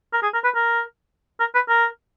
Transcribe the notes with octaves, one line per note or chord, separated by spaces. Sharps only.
A#4
G#4
A#4
B4
A#4
A#4
B4
A#4